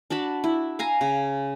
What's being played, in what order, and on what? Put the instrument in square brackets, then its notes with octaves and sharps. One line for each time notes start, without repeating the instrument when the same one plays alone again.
[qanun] D4 F#4 A5 B5
E4
F5 G#5 A#5
C#3